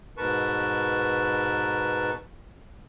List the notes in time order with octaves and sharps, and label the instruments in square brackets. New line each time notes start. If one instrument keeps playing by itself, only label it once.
[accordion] G#2 B2 A#4 B4 A5 C#6